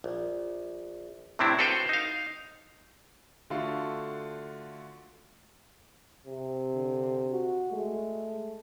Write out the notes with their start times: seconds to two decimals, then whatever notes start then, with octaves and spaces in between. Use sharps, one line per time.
0.04 A#1
1.39 A2 C3 C4 D4 E4
1.59 F#4 A4 B4 C5 F5 G5
1.89 D#4 F5
3.50 D3 A3 F4 F#4 A4
6.27 C3
6.74 D3
7.32 F#4
7.72 G#3 A3